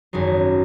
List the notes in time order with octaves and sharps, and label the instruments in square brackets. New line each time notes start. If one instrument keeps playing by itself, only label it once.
[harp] G#1 F#2 F#3 G#4